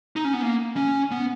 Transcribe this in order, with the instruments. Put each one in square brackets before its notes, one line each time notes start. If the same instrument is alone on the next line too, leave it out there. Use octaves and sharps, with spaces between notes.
[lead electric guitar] D#4
C#4
B3
A#3
C#4
B3